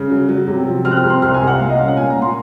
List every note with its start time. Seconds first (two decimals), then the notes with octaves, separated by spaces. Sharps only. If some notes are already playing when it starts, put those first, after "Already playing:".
Already playing: C#3
0.10 F#3
0.29 F#3
0.47 C3
0.67 F3
0.85 C4 F6
0.91 F#6
0.97 F6
1.04 C3
1.10 C6
1.22 C2 F6
1.34 G#5
1.42 C2
1.47 F#5
1.60 A#2 F5
1.69 D#5
1.78 C#4 F5
1.88 F#5
1.97 A#2 G#5
2.10 A#5
2.16 A#2
2.22 C6